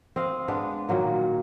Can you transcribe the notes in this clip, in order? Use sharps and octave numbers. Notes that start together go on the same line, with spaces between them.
C4 D#5 F5
G#3 B3 D4 B4
A#2 D#3 F#3 A#3